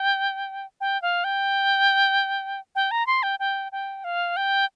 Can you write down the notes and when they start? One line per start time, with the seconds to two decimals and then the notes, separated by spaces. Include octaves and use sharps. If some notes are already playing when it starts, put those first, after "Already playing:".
Already playing: G5
0.81 G5
1.02 F5
1.24 G5
2.75 G5
2.91 A#5
3.07 C6
3.23 G5
3.40 G5
3.72 G5
4.04 F5
4.37 G5